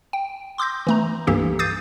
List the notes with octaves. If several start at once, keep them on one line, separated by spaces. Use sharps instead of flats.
G5
C6 D6 E6 G6 A#6
E3 A3 A#5
C2 G2 E3 A#3 G4 A4
D6 D#6 G6 A6 C7 D#7